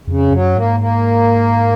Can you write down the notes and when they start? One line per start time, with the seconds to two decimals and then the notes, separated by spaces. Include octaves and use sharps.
0.07 F2 C#3
0.32 F#2 F#3
0.55 G#2 A#3
0.80 A#3